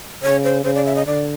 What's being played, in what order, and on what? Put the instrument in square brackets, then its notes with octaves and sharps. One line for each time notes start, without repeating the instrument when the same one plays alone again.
[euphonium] C#3 [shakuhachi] C#5
[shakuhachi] C5
[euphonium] C#3 [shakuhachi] C5
[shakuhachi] D5
E5
D#5
[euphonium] D3 [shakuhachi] D5